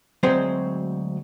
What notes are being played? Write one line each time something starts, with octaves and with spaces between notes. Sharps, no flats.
D2 F#3 G#3 C4 C5